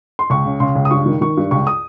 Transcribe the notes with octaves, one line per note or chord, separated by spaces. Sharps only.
C6
C#2 C#6
C#3
C#3 C6
C#2
D#6
G2 C#6
D#3
D#3 C#6
G2
C#2 C#6
D#6